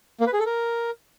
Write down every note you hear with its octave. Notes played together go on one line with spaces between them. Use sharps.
A#3
B4
G#4
A4
A#4